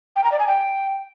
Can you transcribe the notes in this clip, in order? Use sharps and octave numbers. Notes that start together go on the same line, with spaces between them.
G5
A#5
D5
G#5
G5